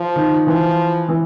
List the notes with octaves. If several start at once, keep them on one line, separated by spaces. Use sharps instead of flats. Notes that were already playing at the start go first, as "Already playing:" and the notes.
Already playing: F3
D#3
E3 F3
E3